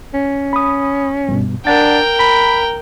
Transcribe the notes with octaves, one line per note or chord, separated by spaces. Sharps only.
C#4
B5 D#6
G2 B2
D4 A#4 F#5 G5 A6
A#5 B5